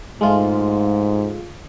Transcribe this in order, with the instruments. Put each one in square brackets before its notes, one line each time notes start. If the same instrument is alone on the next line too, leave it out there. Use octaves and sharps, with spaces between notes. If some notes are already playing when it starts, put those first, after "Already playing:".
[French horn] G#2 [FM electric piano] G#3 A3 F4